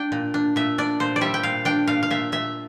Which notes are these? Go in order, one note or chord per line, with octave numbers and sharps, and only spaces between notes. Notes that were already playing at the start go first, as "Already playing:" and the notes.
Already playing: D4 G5
A#2
D4
A#2 E5
D4 D5
A#2 C5
D5
G3 E5
G5
A#2 F5
D4 G5
A#2 F5
F5
A#2 E5
A#2 E5